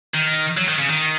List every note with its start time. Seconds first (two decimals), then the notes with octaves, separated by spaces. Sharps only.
0.14 D#3
0.57 F#3
0.68 D#3
0.79 C#3
0.90 D#3